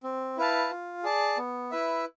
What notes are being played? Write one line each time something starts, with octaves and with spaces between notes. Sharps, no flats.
C4
E4 B4 F5 A5
F4
G#4 D5 A5
B3
E4 B4 E5